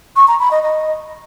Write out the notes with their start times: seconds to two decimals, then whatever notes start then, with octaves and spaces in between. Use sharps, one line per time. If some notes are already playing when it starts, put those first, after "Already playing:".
0.16 C#6
0.28 A#5
0.39 B5
0.51 D#5
0.63 D#5